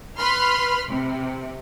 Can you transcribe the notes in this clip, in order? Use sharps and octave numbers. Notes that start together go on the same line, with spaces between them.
B4 B5 C6 F6
C3